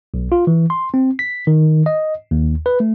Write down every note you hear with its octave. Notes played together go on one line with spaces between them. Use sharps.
B1
F4
E3
C6
C4
B6
D#3
D#5
D#2
B4
A3